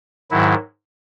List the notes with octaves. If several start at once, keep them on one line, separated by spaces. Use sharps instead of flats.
G#2 D#3 F#3 E4